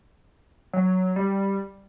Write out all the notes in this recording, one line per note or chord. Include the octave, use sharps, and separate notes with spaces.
F#3
G3